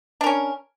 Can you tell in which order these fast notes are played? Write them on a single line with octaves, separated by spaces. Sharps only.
D4 A#4 C#4